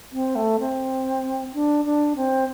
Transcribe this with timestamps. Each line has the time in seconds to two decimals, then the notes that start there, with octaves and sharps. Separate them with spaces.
0.12 C4
0.35 A3
0.60 C4
1.54 D4
1.85 D4
2.16 C4